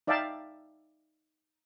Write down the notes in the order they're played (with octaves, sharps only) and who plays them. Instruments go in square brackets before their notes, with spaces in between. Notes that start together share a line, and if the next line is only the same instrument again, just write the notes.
[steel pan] D#4 D5 E5 F5 G5 A5